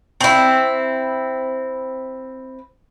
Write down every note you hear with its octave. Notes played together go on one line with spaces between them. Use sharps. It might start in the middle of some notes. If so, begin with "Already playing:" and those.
C4 E4